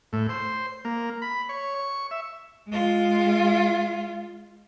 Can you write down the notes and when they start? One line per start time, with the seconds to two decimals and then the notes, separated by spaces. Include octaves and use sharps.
0.13 A2
0.29 C5
0.85 A#3
1.22 B5
1.49 C#5
1.75 C#6
2.11 E5
2.68 G#3 F4